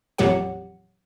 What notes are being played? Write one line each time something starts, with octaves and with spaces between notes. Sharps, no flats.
A1 F2 A#2 F#3 G4 F#5